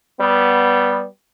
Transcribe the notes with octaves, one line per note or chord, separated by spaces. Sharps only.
G3 B3